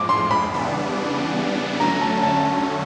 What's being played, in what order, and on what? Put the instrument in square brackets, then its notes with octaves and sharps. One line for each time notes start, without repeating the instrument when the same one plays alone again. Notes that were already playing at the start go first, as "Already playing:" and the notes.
Already playing: [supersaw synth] A2 F3 G#3 [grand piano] D6
[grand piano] C6
B5
[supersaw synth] C#3 E3 G3 B3 D4
[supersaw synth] D3 F#3 A3 C#4 [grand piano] A#5
[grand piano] A5
A5